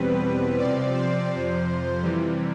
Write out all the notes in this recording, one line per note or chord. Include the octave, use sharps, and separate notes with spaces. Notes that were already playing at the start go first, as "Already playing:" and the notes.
Already playing: E2 B2 G3 C4 B4
C3 F3 C4 D5
C5
F2 C3 F3
C3 E3 G3